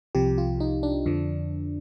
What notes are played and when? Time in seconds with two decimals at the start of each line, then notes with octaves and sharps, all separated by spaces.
0.15 C2 C3 F3 G4
0.38 F4
0.60 D#4
0.83 D4
1.06 F2 D3 F3